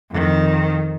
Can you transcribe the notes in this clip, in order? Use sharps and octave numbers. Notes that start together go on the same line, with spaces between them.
F2 D#3